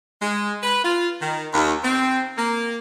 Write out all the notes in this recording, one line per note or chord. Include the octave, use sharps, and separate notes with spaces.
G#3
B4
F4
D#3
D#2
C4
A#3